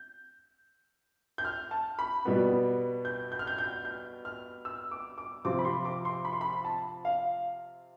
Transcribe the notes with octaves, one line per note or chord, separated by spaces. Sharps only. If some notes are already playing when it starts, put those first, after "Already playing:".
Already playing: G6
G6
F6
A5
B5
B2 G3 B3
G6
G6
F6
G6
G6
G6
F6
E6
D6
D6
C3 F3 C4 F4 D6
B5
C6
D6
C6
B5
C6
B5
A5
F5